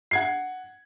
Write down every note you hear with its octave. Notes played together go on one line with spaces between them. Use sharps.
F#5 G#6 C7